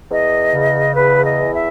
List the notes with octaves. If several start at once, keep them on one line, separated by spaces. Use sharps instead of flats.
E2 D#5
C#3
E2 B4
D#5
E3
E5